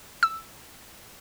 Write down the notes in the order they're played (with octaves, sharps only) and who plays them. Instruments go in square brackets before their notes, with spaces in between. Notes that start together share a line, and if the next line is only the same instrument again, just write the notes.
[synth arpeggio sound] E6